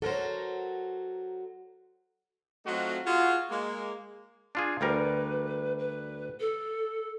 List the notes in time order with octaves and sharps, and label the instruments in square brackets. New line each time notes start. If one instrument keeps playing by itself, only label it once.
[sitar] F#3 A#4 [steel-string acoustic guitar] A4 C5
[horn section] F#3 A3 C4 D#4 F4 F#4
F4 F#4 G#4
G#3 A#3
[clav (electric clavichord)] D4 F4 G#4
[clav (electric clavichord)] D2 G3 A#4 [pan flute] B4
[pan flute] B4
A4